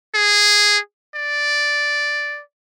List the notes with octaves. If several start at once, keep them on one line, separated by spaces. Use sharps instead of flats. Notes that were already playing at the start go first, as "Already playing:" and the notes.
G#4
D5